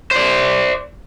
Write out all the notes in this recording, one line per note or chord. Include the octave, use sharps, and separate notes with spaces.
C5 D5